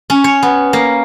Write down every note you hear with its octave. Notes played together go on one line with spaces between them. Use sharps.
C#4
C#5
B3
A#3